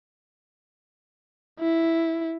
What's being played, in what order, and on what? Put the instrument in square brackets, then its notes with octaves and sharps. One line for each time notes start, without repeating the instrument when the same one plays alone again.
[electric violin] E4